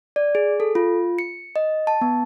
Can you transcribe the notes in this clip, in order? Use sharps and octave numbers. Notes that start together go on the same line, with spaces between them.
D5
G#4
A4
F4
C#7
D#5
A5
B3